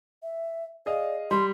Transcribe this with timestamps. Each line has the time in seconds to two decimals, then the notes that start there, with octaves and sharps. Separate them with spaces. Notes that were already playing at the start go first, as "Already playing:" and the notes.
0.23 E5
0.86 G#4 D5 D#5 F5
1.31 G3 C6